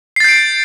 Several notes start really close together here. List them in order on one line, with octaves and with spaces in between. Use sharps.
C7 A6 G6 D7